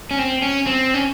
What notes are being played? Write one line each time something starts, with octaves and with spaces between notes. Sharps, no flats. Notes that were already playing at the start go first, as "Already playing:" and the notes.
C#4
C4
C#4
C4
C#4